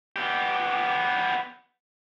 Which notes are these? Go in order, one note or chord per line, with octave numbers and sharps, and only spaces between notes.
B3 G4